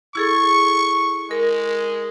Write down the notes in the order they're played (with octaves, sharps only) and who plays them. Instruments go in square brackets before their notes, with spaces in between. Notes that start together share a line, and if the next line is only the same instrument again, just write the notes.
[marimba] E4 G#4 A4 [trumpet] C#6
[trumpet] G#3 [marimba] A#4